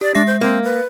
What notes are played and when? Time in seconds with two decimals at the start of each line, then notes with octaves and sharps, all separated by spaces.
0.01 G4 D5
0.15 G#3 D4 E5 A#6
0.27 C5
0.41 A#3 C4
0.64 B4